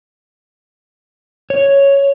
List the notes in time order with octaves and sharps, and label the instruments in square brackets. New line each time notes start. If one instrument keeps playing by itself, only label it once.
[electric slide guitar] C#5